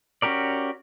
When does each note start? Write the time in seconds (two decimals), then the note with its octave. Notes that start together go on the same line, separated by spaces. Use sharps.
0.22 C#4 F#4 G4 A#4 D5